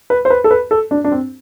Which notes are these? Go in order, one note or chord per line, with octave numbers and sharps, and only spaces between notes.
B4
C5
B4
A4
B4
A4
D4
D4
C4